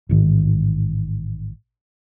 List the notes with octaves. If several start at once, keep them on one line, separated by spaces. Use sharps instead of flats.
A1 G#2 D#3